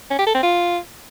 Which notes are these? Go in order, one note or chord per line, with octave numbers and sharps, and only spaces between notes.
C#4
G4
A4
C4
F4